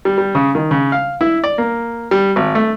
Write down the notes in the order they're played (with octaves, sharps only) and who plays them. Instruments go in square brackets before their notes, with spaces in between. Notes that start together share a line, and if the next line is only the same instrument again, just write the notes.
[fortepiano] G3
G3
C#3
D#3
C#3
F5
E4
D5
A#3
G3
G#1
A3